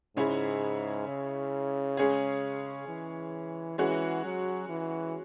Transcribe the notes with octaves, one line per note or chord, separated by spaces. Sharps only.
G#2 C#3 G#3 C#4 E4
C#3
G#3 C#4 G#4
E3
E3 G#3 C#4 F#4
F#3
E3